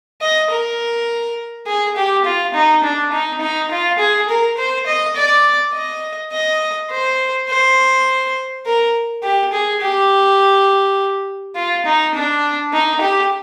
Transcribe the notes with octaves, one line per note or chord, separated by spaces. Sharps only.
D#5
A#4
G#4
G4
F4
D#4
D4
D#4
D#4
F4
G#4
A#4
C5
D#5
D5
D#5
D#5
C5
C5
A#4
G4
G#4
G4
F4
D#4
D4
D#4
G4